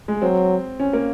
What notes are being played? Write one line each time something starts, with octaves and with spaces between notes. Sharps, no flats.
G#3
F#3 C4
C#4
A#3